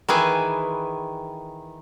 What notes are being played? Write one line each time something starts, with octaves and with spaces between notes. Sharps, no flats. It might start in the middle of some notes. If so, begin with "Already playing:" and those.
D#3 E3 G#4 B4